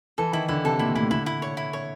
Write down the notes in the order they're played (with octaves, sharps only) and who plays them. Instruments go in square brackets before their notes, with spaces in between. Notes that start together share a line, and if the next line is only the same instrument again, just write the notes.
[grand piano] E3 [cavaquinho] A4
[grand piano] D#3 [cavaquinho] E4
[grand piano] D3 [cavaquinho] E4
[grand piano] C3 [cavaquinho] A4
[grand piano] A#2 [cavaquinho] E4
[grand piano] A2 [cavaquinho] E4
[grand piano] D3 [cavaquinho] E4
[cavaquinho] E4
C#5
E4
C#5